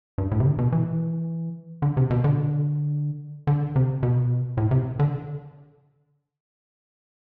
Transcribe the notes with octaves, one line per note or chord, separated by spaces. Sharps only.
G2
A2
C3
D3
B2
E3
D3
C3
B2
D3
D3
C3
B2
A2
C3
D3